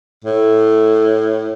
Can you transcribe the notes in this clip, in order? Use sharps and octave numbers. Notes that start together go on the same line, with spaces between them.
A2